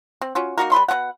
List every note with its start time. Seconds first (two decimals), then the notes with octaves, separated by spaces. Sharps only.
0.21 C4
0.35 C#4 F4 F#4
0.58 A#3 D#4 F#4 A#4
0.72 G3 B4 B5 C6
0.88 B2 C#4 B4 F#5